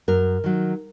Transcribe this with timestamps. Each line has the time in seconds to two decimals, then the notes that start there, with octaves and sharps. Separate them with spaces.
0.08 F#2 A#4
0.44 D#3 F#3